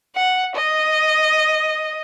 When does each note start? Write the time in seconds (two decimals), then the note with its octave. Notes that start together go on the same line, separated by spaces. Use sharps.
0.16 F#5
0.56 D#5